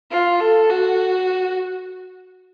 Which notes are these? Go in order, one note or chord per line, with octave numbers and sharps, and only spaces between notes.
F4
A4
F#4